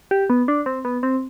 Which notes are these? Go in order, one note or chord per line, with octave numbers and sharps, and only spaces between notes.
G4
B3
D4
C4
B3
C4